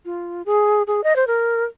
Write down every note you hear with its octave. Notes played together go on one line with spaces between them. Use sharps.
F4
G#4
G#4
D#5
C5
A#4